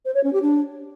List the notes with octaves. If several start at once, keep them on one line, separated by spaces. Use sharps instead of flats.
C5
C#5
C#4
G4
D4